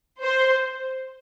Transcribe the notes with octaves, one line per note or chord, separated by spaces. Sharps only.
C5